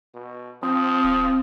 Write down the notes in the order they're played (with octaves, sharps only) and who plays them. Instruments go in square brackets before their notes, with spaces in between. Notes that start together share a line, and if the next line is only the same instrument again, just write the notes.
[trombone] B2
[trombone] F3 [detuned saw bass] C4 [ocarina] D#6
[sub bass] D1